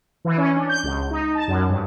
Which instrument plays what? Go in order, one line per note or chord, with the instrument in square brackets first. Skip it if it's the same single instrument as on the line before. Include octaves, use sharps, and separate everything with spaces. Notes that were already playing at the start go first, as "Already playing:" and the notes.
[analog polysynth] E3
C#4
D4
G6
C#2
D#4
A5
F#2
G2